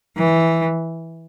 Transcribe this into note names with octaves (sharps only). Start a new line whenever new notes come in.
E3